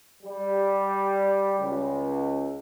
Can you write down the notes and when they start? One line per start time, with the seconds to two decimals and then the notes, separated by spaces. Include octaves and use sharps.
0.23 G3
1.60 C#2